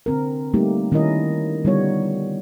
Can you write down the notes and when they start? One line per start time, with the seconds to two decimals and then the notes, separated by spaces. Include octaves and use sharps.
0.06 D3 C4 A#4
0.54 G3 A3 A#3 D#4 G4
0.92 D#3 C#4 E4 A#4 D#5
1.64 D3 G3 B3 D#4 F4 C#5